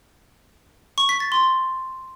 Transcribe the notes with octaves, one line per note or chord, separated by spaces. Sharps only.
C#6
B6
A6
C6